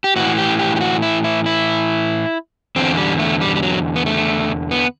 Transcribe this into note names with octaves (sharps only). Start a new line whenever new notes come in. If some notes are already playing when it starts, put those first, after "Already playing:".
G4
A2 E3 F#4
G4
G4
G4
F#4
E4
E4
E4
E2 D3 C4
G3
A3
G3
G3
F#3
B3
A3
B3